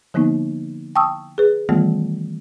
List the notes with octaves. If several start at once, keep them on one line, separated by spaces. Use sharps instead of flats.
D3 F3 A#3 B3 D#4
G5 A5 C#6 D#6 E6
G#4 B4
D#3 E3 G3 A3 B3 F4